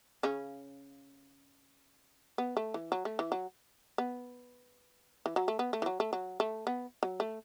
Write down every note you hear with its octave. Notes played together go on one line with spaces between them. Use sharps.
C#3 C#4
B3
A3
E3
F#3
A3
E3
F#3
B3
E3
F#3
A3
B3
A3
E3
F#3
A3
F#3
A3
B3
F#3
A3